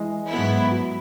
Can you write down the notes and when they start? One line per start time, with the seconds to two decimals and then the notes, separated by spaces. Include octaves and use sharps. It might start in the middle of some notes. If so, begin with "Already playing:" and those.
Already playing: E3 G#3
0.29 G#2 F#3 B3 E4
0.71 F#3